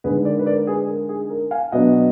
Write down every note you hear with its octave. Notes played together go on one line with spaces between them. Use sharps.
D3 G#3 D#4 G#4 B4
A#4 D5
B4
A#4 D5
G#4 B4
A#4
G#4
A#4
F5 G#5
B2 F#3 B3 D4 D#5 F#5